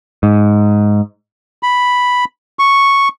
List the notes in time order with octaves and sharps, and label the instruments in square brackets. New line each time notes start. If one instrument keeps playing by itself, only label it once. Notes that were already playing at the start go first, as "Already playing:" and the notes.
[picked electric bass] G#2
[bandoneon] B5
C#6